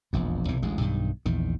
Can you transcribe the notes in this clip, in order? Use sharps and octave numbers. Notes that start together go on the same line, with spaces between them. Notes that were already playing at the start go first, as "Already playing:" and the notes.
E1 A#1 F2
B1 C3 E3
A1 D2 G#3
B1 G2 D#3
A#1 E2 D#3